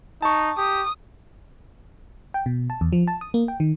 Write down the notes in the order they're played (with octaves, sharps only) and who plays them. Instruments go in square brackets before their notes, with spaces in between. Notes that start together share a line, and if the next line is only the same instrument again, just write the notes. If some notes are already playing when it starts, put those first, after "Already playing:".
[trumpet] D#4 [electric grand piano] A5 C#6
[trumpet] G4 [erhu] D#6
[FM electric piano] G5
B2
A5
E2
F3
A5
D#6
A#3
G5
D#3